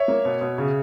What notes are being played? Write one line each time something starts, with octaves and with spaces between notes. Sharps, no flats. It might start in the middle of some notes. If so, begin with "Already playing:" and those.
Already playing: C#5 E5
A#3
B2
B2
C#3